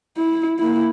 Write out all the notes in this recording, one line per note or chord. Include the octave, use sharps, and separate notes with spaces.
E4
A#3 E4